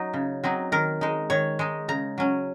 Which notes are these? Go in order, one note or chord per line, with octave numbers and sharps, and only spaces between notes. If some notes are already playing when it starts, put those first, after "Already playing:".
Already playing: F#3 D#4
C#3
F#3 C4 D#4
D#3 A#4
G#3 D#4
D#3 C#5
G#3 D#4
C#3 A#5
F#3 C#4